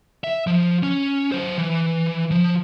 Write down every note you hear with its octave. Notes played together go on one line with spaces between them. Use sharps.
E5
F3
C#4
F#3 C5
E3
F3